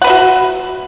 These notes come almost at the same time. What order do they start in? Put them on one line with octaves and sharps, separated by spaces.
F#5 B4 E5 F#4